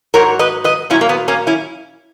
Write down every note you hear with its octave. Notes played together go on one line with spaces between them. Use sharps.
G#2 F#3 A#4 C#5
B4 D#5
B4 D#5
A#2 F#3 C#4 E4
A#3
B3
A#3 C#4
C#4 E4